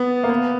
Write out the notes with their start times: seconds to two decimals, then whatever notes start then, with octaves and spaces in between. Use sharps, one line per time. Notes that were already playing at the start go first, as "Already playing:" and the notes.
Already playing: B3
0.24 A#3
0.30 B3